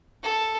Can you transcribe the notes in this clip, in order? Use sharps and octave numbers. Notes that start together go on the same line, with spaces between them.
A4